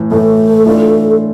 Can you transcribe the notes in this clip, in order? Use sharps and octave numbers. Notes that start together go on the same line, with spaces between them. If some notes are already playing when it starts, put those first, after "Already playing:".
Already playing: A2 E3 A3
A2 E3 A3 A4
E3 A3 D4 F4